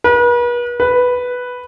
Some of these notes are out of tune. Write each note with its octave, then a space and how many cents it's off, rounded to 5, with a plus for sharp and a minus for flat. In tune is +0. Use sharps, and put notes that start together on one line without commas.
B4 -40
B4 +0